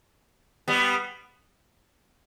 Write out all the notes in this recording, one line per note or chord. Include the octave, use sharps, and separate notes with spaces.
G3 B3